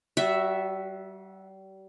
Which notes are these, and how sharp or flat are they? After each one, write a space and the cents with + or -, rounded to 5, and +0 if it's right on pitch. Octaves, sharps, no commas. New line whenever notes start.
G3 -35 F#4 +0 E5 +0